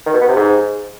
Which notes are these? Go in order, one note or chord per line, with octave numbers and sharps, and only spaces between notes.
D#3
B2
B3
C3
G#2